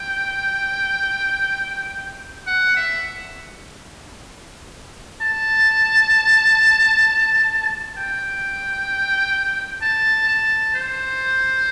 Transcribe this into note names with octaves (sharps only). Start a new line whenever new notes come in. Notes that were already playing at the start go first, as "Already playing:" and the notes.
Already playing: G5
F#5
E5
A5
G5
A5
A5
C5